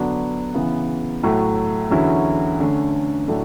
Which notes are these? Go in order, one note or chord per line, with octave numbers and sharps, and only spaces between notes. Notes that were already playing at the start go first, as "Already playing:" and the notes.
Already playing: D3 F#3 B3 D4
C#3 E3 B3
A2 F#3 A3
E2 D3 F#3 C#4 E4
D3 A3 C#4
A2 F#3 A3 D4